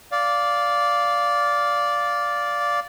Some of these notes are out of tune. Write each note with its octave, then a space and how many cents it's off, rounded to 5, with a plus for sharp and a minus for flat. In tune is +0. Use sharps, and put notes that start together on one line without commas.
D5 -10 F5 +0